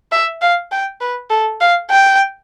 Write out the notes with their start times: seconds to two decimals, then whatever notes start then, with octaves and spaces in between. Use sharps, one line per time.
0.12 E5
0.42 F5
0.71 G5
1.01 B4
1.30 A4
1.61 F5
1.91 G5